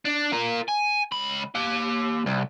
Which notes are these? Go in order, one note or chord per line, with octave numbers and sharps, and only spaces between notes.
D4
F4 A#4
G#5
C#2 B5
A#3 G4
C2